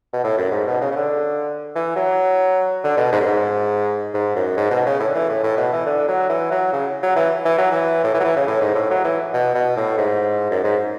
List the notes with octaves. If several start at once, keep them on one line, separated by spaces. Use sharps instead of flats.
B2
A2
F#2
G#2
B2
C#3
C#3
D3
E3
F#3
D3
B2
G#2
F#2
G#2
G#2
F#2
G#2
B2
C#3
A2
D3
E3
A2
A2
B2
E3
D3
F#3
E3
F#3
C#3
F#3
E3
E3
F#3
E3
A2
E3
F#3
E3
C#3
A2
G#2
A2
F#3
E3
B2
B2
A2
G#2
F#2
G#2